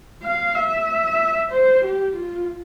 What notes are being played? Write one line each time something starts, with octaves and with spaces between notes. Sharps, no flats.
F5
E5
C5
G4
F4